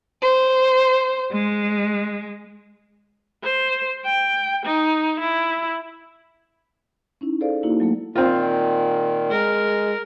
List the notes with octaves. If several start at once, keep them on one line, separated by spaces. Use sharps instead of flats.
C5
G#3
C5
G5
D#4
E4
C#4 D#4 E4
G#4 A4 C5 D5 F5
A#3 D#4 E4 F#4
F#3 A3 A#3
A#2 D#3 C4 F4
G#3 A#4